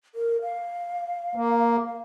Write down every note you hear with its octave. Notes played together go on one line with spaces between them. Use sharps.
A#4
F5
A#3